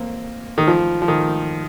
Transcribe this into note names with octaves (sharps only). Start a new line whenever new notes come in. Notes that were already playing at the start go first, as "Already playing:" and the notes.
Already playing: A#3 C4
D#3
F3
F3
D#3